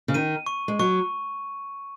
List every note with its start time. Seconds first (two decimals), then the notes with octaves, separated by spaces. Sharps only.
0.08 C#3
0.14 D#3 D#7
0.46 C#6
0.68 G#3
0.79 F#3 C#6